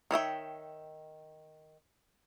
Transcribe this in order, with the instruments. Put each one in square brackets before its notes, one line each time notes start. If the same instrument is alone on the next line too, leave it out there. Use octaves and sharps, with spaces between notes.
[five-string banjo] D#3 C#5 E5 G5